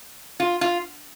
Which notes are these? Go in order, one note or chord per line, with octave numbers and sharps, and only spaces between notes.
F4
F4